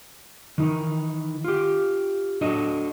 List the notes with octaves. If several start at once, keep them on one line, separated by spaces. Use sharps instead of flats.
D#3 E3 D#4
F4 G4
D4 F#4 A4 D#5